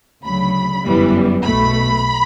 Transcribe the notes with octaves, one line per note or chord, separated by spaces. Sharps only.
D2 C#3 F#3 B5
G1 F#2 E3 G3 B3
B1 B2 A3 B5